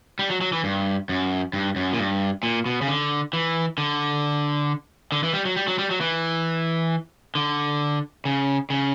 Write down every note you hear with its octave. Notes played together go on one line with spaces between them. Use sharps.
G3
F#3
F#3
E3
G2
F#2
G2
F#2
A#2
G2
A#2
B2
C#3
D3
E3
D3
D3
E3
G3
F#3
G3
F#3
G3
F#3
E3
D3
C#3
C#3